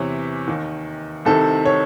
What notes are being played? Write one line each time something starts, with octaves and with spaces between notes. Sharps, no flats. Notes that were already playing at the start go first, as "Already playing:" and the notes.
Already playing: E2 C3 E3 C#5
D#2 D#3
C2 C3 D#3 A4
C#5